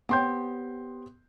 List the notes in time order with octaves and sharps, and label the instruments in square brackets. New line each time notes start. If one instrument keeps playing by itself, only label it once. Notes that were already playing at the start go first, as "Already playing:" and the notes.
[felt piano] B3 C6 G6 [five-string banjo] C4 G4 C#5